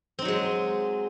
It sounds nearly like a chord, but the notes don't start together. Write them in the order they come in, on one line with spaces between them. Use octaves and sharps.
C4 D#4 F#3 G#3